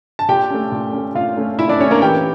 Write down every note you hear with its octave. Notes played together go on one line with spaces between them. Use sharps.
A5
A#2 G4 G5
A3 C#4
A#2
A3 C#4
A#2 F4 F5
A3 C#4
A#2 E4 E5
D4 D5
A3 C#4 C#5
A#3 A#4
E3 G4 G5